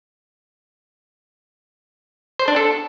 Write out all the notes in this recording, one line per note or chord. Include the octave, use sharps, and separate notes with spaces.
C5
D4
A4